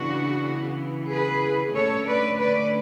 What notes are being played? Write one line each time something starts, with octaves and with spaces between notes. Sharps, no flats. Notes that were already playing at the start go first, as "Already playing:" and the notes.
Already playing: C#3 E3 B3 D4 F#4
G#4 B4
D3 A3 C#4 A4 C#5
B4 D5
B4 D5